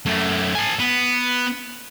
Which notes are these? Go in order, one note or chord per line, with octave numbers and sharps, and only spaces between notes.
F#2 A3
A4 G#5
B3